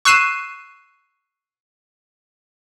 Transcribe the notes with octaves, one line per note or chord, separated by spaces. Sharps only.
C#6 E6 F#6 C7 D#7 E7